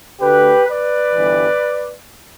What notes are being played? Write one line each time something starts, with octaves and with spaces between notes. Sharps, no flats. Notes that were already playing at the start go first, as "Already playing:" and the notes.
D2 D3 A3 G4 B4
B4 D5
G1 G2 E3